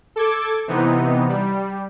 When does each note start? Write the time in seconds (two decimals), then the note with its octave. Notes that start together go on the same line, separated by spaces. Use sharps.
0.16 A4 D6 G#6
0.68 C3 E3 B3 D#4
1.29 G3